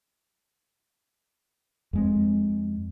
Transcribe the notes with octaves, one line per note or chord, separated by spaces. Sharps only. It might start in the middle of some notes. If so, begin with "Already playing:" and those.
F2 G#3 C4